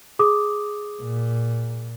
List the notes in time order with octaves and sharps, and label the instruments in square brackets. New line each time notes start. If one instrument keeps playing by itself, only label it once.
[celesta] G#4 D6 D#6
[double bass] A#2